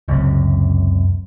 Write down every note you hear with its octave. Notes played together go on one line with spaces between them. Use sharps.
F#1 C#2 F#2 C3